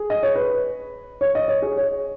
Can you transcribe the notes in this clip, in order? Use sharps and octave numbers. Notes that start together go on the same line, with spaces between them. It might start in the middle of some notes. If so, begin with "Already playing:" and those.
Already playing: G#4
D#5
C#5
B4
C#5
D#5
C#5
G#4
C#5